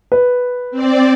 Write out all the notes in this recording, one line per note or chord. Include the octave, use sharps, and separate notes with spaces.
B4
C4 D5